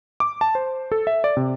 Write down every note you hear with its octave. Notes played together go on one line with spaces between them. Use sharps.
D6
A5
C5
A4
E5
D5
C3